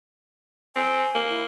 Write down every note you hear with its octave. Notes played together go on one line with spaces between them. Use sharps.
C4 G#5
A#3
E4